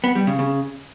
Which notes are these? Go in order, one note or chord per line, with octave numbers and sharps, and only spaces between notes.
B3
G3
C#3
C#3